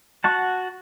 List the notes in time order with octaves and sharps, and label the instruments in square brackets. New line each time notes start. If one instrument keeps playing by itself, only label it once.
[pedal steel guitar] F#4 F#5 A5